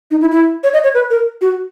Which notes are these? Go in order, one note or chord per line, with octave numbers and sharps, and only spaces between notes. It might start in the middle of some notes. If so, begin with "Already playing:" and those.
D#4
E4
E4
C#5
D#5
C#5
B4
A#4
F#4